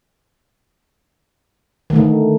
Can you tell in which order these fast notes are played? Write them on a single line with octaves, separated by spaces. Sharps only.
D#3 A3 D3